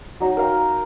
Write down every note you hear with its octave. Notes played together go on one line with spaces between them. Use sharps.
F#3 D#4
A#4 F5 G5